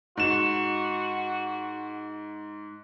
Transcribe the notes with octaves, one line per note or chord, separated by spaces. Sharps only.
G#2 F#4 E7